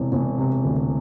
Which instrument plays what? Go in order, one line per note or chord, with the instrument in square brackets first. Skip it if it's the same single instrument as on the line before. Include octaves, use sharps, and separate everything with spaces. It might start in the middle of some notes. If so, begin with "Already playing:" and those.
Already playing: [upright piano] E1 C3 E3
E1
C3
D2